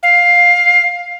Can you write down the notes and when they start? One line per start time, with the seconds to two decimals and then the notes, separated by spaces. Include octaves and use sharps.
0.03 F5